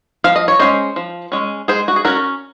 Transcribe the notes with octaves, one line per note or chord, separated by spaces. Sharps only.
F3 F5
D#5
C#5
G#3 C#4 C5 D#5
F3
G#3 C#4
G#3 G#4 C5
F#4
G#4
C#4 F#4 A#4